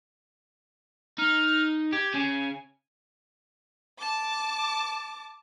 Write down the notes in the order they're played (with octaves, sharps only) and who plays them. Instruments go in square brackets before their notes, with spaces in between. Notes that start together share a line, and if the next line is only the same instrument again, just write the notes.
[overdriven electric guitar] D#4 [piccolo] F6
[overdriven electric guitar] G4 [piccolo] G#6
[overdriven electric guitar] C#3 [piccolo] G#5
[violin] A5 D6